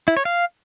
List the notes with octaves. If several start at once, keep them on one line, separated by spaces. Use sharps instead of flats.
E4
C#5
F5